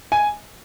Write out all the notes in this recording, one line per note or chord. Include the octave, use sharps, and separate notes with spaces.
G#5